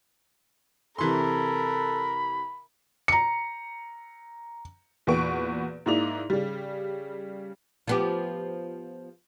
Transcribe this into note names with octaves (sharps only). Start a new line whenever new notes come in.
C3 E3 A4 A#4 B5 C6
A#5 C#7
E2 A#2 F#4 B4 C#6 D7
G#2 A#3 D#4 E4 D5 F7
C#3 G3
F3 B3 G4